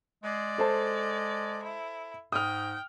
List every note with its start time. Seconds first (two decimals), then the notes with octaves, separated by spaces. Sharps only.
0.24 G#3 D5
0.58 A4 C5 A5
1.63 E4
2.32 G#2 G5 D#6 F6